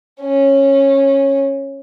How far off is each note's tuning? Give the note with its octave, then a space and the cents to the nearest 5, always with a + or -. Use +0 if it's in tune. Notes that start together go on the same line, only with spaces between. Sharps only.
C#4 -15